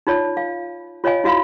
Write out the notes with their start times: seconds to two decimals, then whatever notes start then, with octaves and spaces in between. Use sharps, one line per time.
0.07 D#4 F4 C#5 D5 A5
0.37 F5
1.04 F4 C#5 D#5 F5 G#5
1.24 E4 F#4 E5 F5 B5